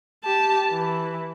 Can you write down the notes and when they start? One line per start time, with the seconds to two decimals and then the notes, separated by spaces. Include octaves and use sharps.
0.24 G4 A5
0.71 E3